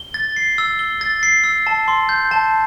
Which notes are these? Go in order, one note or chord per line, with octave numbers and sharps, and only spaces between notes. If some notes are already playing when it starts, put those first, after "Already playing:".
Already playing: G7
A6
C7
E6
G7
A6
C7
E6
A5
C6
G6
A5